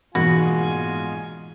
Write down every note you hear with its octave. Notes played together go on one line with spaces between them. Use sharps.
A#1 G#2 B2 E3 G#3 F4 F#4 G#5